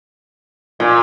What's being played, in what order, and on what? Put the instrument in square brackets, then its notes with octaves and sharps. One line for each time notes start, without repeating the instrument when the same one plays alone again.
[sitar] A#2